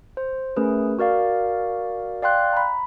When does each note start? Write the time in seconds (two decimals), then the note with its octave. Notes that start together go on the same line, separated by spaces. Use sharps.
0.17 C5
0.56 A3 C#4 G#4 A#4 B4
0.99 F#4 A#4 D5 F5
2.22 D5 F5 G5 C6 F#6
2.53 A#5 B5